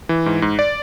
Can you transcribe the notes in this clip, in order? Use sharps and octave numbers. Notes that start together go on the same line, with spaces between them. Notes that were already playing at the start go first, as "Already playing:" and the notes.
E3
G#2
G#2
D5